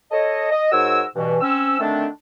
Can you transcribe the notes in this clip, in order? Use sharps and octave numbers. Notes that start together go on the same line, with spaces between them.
A4 C#5 D#5
D#5
G#2 F#4 A#4 C#5 E6
G2 B2 E3
C4 C#4 E6
D3 D#3 A3 C4 D4